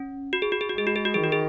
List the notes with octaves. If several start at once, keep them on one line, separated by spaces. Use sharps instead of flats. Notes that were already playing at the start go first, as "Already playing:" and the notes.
Already playing: C#4
F#4
G#4
F#4
G#4
F#4
G#3 G#4
F#4
G#4
F#4
D#3 G#4
F#4
G#4